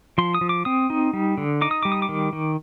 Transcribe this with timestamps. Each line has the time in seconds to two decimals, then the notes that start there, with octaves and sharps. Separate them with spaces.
0.18 F3 C6
0.34 D#6
0.41 F3
0.49 D6
0.65 C4 D#6
0.90 D#4
1.13 G3
1.38 D3
1.61 D#4 D6
1.71 D#6
1.83 G3 D6
1.92 D#6
2.02 D6
2.09 D#3
2.33 D#3